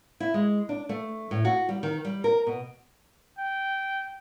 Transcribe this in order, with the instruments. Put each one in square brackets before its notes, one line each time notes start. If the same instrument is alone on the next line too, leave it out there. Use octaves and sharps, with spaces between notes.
[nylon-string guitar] E4
G#3
D4
A3
A2
F#4
G3
D#3
G3
A#4
B2
[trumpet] G5